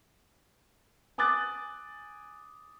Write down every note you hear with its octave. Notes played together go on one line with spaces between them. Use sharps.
G#5 D6 D#6 F#6 A6